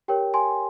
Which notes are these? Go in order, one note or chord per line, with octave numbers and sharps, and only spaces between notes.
G4 A#4 C#5 G5
G#5 C6